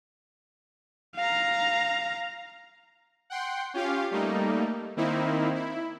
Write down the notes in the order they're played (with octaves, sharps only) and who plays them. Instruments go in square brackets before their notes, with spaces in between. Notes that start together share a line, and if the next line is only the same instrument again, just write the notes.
[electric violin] F5 A#5
[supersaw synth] F#5 G5 C6
C#4 F4 G4 F5
G3 A3 A#3 D#4
D#3 A#3 C4 D#4 E4
E4